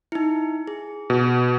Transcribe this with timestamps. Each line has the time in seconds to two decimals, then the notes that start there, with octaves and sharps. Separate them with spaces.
0.12 D#4 E4
0.67 G#4
1.10 B2